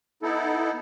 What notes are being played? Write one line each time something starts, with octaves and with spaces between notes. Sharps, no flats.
B3 D#4 E4 A4